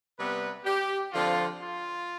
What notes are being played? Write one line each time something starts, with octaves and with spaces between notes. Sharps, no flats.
C3 G3 B3 B4
G4
D3 F3 C4 F4
F4